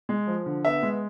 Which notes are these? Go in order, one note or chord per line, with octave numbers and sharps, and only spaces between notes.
G#3
F3
D3
B3 E5
G#3